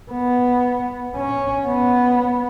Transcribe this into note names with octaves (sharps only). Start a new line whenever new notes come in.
B3
C#4
B3